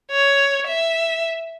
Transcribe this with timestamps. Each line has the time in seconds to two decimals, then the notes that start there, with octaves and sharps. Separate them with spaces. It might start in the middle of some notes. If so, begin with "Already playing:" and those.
0.11 C#5
0.67 E5